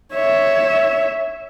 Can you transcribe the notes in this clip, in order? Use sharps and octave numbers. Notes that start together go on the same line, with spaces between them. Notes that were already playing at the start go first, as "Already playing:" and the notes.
C#5 E5